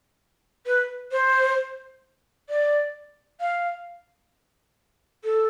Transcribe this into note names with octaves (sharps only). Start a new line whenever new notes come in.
B4
C5
D5
F5
A4